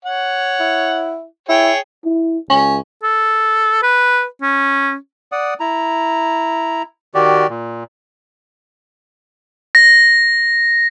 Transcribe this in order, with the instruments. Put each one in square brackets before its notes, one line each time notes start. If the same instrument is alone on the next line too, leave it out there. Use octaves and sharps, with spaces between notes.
[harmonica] C#5 F#5
[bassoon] E4
[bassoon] E4 [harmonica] G#4 C#5 G5
[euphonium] E4
[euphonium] C#2 [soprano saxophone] C#4
[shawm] A4
B4
C#4
[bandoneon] D5 F#5 D#6
E4 A#5
D#3 F#4 G4 D5
A#2
[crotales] A#6